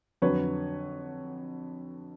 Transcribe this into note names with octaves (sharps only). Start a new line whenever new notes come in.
F2 D3 F#3 B4 C#5